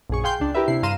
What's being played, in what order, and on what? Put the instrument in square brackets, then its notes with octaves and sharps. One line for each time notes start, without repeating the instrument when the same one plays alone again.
[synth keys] A#1 F#2 G#4 C#6
G#4 F5 G5 C6 G6
C#2 D4
E4 G4 A#4 B4 E5
C3 D4 E4 C7
G2 F5 A#5 C6 D#7 E7